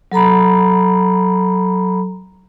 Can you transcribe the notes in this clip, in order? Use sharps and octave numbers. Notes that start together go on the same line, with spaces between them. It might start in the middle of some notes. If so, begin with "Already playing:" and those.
F#3 A4 A#5 B5